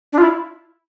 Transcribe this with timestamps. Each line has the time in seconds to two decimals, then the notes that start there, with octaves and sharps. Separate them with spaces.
0.13 D4
0.18 F4
0.22 E4